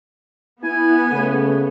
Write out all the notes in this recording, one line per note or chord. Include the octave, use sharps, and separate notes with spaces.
B3 E4 G#5
C#3 A3